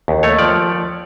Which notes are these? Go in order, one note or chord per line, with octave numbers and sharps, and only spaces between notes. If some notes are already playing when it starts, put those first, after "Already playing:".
D#2
A3 C#5
F3 D5